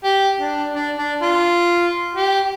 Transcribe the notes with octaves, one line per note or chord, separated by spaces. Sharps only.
G4
D4
D4
D4
F4
G4